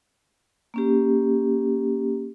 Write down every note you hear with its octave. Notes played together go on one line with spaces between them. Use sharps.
A#3 C#4 G4